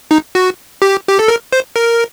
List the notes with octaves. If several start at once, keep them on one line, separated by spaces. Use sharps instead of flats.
D#4
F#4
G4
G4
A4
A#4
C5
A#4